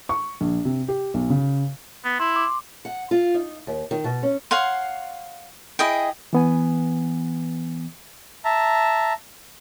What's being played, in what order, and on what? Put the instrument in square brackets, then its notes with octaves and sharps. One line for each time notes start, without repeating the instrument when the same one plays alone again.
[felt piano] C#6
A#1
C3
G4
B1
C#3
[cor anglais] B3
[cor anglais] E4 [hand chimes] C6
[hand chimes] D6
[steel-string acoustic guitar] F#5
F4
D#4
D#2
D#3
B2
C#4
[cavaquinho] C#5 F5 F#5 C6
E4 G#4 D#5 G5
[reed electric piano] E3 B3 G#5
[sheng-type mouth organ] E5 A5 A#5